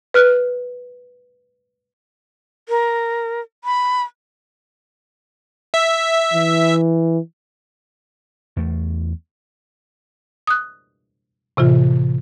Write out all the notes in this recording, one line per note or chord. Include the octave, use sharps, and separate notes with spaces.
B4 F6 F#6
A#4
B5
E5
E3
E2 A3
D#6 F#6
A2 C3 E3 F4